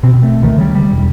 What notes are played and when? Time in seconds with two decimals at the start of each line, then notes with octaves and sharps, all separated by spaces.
0.03 B2 C4
0.23 A3
0.42 C#2 D#3 A3
0.58 C#3 G3
0.75 G3
0.91 E1